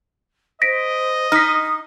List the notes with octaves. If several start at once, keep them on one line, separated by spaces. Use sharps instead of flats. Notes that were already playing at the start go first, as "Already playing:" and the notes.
C5 D#5 A#6 B6 D7
D#4 D#6 F6 B6